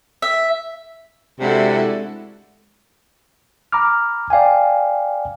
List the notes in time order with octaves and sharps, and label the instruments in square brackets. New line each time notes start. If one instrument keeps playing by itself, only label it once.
[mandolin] E5
[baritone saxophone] C3 [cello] G#3 A4 [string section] D4 E4 F#4
[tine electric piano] A#5 B5 D6 F6
D5 F5 G5 G#5